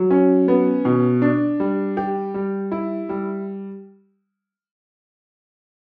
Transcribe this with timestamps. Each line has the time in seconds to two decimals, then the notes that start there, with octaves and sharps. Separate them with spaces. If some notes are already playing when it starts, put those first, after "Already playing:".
Already playing: F#3
0.11 C#4
0.48 B3
0.85 B2
1.22 D4
1.60 G3
1.97 G4
2.34 G3
2.72 E4
3.09 G3